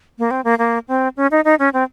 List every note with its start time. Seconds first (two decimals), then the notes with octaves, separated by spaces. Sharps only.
0.19 A#3
0.31 C4
0.44 A#3
0.59 A#3
0.88 C4
1.17 C#4
1.31 D#4
1.45 D#4
1.59 C#4
1.73 C4